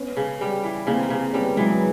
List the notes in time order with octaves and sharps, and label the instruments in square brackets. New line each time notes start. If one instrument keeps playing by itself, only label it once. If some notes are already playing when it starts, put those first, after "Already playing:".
Already playing: [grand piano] B3 C#4
[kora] C#3
G3
E3
[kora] C#3 [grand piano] A#3 C4
[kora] C#3
[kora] G3 [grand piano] B3 C#4
[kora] E3 [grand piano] F#3 G#3